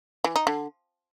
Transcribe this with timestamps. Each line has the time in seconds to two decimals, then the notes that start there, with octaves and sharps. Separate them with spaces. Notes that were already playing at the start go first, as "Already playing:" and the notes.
0.24 E3
0.36 D#4
0.47 D3